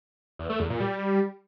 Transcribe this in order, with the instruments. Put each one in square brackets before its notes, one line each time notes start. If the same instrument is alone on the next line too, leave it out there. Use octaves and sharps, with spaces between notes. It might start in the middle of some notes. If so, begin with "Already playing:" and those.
[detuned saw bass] E2
A3
E2
A#2
G3